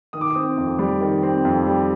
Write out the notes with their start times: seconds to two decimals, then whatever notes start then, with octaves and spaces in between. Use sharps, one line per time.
0.13 D#3 D#6
0.21 D6
0.30 D#6
0.35 C4
0.58 F2
0.79 G3
1.01 D#3
1.23 C4
1.45 F2
1.67 G3